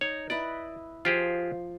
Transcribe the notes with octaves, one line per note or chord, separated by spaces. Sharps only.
D#4 C#5
E4 B4 D5 D#5
F3 F4 G4 G#4